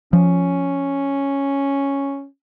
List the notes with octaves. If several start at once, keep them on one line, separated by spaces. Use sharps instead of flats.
F3 C#4